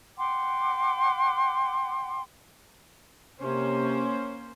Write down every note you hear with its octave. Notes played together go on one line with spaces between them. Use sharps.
F#5 G5 C6 D6
C3 A#3 C#4 C5